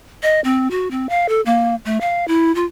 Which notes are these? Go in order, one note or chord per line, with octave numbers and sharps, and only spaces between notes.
D#5
C4
F#4
C4
F5
A4
A#3
A3
F5
E4
F4